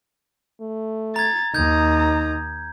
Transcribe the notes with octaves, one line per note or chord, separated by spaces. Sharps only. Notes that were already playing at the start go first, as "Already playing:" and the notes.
A3
A#5 G#6 A6
D#2 D#4 A#5 D#6 G6 G#6